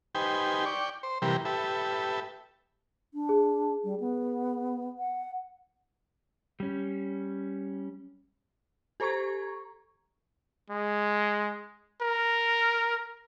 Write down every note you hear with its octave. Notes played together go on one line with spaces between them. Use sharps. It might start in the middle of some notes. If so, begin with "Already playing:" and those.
D#4 G4 B4 C5 G5 G#5
D5 G5 C#6
C5
C3 E3 G3 G4 A#4 B4
G4 A4 B4 E5
D4
G#4
G3
B3
F#5
G3 C#4
G4 A4 C5 A#5 C#6 G#6
G#3
A#4